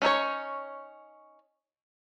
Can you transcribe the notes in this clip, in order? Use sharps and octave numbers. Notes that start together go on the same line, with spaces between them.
C#4 D#4 E4 C#5